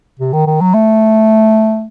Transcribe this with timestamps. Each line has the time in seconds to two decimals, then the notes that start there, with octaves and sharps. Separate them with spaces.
0.19 C3
0.33 D#3
0.47 D#3
0.61 F#3
0.74 A3